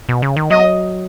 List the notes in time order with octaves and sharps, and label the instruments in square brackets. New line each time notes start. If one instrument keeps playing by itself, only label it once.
[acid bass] B2
C#3
D#3
[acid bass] F#3 [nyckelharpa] D#5